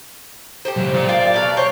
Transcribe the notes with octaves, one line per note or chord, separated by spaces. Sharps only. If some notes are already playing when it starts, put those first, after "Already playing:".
G4 A4 C5
C#2 F#3
F4 D5
A#3 F4 G4 D5
B2 F#3 F5
C5 C#5